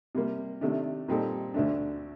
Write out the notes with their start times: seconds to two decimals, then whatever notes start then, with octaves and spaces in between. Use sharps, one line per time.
0.15 C3 G3 A#3
0.61 C3 D#3 A3 D4
1.08 A#2 G3 C4 D#4 A4
1.54 D2 D3 A3 D4